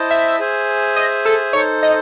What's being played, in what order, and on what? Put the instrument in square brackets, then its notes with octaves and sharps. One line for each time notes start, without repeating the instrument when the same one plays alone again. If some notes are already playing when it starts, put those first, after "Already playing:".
Already playing: [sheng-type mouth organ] E4 C5 D#5 A5
[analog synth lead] E5
[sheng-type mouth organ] G#4 C5 E5 G#5
[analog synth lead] D#5
A4
[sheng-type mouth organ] D#4 A4 C5 [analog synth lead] C#5
[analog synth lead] D#5